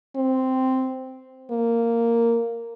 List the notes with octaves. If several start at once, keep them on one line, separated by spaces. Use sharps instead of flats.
C4
A#3